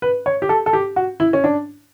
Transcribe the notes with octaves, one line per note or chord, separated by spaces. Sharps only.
B4
C#5
G4
A4
A4
G4
F#4
E4
C#4
D4